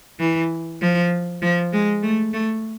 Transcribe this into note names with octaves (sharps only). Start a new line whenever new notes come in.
E3
F3
F3
G#3
A3
A3